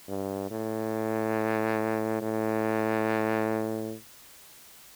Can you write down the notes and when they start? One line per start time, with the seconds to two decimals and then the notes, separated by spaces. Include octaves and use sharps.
0.08 G2
0.50 A2
2.21 A2